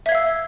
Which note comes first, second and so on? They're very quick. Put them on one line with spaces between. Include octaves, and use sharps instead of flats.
E5 G#6 F5 E6